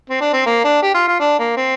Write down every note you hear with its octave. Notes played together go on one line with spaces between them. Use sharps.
C4
D4
C4
A#3
D4
G4
F4
F4
D4
A#3
C4